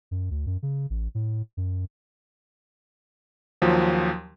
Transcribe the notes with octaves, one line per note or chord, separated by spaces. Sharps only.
F#2
D2
F#2
C#3
A1
A2
F#2
D#2 F3 F#3